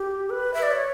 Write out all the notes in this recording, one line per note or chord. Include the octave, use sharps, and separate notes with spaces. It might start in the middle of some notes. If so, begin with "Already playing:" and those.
Already playing: G4
B4
E5
D5
C#5